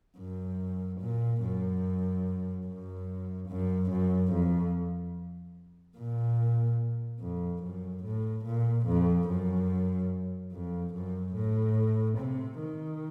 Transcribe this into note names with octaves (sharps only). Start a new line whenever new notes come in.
F#2
A#2
F#2
F#2
F#2
F#2
F2
A#2
F2
F#2
A2
A#2
F2
F#2
F2
F#2
A2
C3
D#3